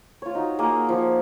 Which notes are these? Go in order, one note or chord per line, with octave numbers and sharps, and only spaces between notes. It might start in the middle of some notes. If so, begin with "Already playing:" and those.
F4 C#5
D#4 F#4
A#3 G#4 A#4 D#6
F3 C#6